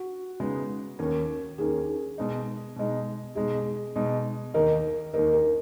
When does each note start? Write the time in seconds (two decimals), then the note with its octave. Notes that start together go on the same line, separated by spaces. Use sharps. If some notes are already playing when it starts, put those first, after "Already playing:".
Already playing: F#4
0.40 C#3 G#3 B3 D#4
0.99 D#2 D#3 A#3 C#4
1.58 D#2 D#3 A#3 C#4 G#4
2.18 B2 G#3 D#4
2.76 B2 G#3 D#4
3.35 B2 G#3 D#4 G#4
3.96 B2 G#3 D#4
4.54 D#2 D#3 A#3 D#4 A#4
5.14 D#2 D#3 A#3 D#4 A#4
5.33 A#4